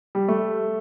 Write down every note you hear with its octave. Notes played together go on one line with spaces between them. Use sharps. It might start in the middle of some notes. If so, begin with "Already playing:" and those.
G3
A3